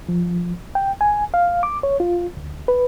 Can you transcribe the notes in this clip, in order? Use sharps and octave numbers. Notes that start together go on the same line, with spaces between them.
F3
G5
G#5
F5
D6
C#5
F4
D2
B4